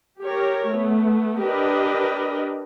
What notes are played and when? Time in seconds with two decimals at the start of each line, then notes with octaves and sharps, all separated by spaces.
0.22 G4 A#4 C#5
0.70 A3 B3
1.41 D4 G4 A#4 B4 D#5